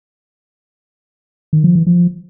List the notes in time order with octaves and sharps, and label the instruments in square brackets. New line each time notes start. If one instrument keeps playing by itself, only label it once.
[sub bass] D#3
F3
E3
F3